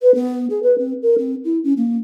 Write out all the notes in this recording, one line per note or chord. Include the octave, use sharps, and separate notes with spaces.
B4
B3
G#4
B4
C4
A#4
C4
E4
C#4
A#3